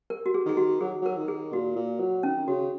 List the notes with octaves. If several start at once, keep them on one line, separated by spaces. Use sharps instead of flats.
A#4
F#4
G#4
D#3 G#4
F#4
F#3 G#4
F#3 A#4
D#3
G#4
A#2 F#4
A#2
F#3
D#3 C#4
C#3 F#4